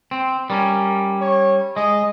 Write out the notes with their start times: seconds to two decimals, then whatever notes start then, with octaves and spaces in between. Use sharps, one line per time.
0.11 C4
0.50 G3 C#4 A#4
1.21 C#5
1.77 G#3 D#5